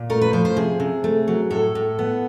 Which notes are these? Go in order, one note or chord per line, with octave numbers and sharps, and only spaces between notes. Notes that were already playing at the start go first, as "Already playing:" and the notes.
Already playing: A#2
A3 A#4
B4
F3 C5
C5
C3 G#4
C3
A3
F#3
A2 A4
A2
B3